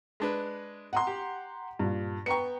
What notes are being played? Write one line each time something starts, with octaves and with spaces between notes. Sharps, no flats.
G#3 D4 B4
F#5 A#5 C6
G4
G2 A#2
B3 G5 A#5 C#6 C#7